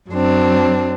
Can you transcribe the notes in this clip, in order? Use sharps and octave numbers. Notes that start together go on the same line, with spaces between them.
F#2 F#3 C4 D4